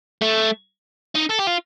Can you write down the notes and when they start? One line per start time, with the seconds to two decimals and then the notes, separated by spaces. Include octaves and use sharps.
0.22 A3
1.16 D#4
1.30 A4
1.39 G4
1.47 F4